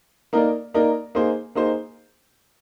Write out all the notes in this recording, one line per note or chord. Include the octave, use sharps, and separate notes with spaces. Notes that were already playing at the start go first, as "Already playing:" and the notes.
A#3 D#4 A#4 D5
A#3 D#4 A#4 D5
A#3 D#4 G#4 C5
A#3 D#4 G#4 C5